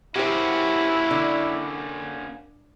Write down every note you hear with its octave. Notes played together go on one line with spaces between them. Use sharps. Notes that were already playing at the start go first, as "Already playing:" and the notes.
A#3 C#4 E4 F#4 G4 C5
D3